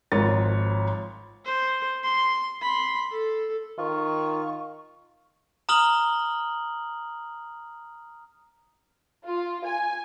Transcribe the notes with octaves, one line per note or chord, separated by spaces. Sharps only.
G#1 G#2 F3 C#5 A6
C5
C6
B5 C6
A4
D#3 F4 C#6
A#5 D#6 F6 F#7 G7
F4
G#5